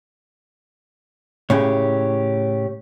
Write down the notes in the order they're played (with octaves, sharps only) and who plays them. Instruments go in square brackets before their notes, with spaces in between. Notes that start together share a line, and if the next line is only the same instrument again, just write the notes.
[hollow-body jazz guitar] A2 C#3 [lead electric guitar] G4 C#5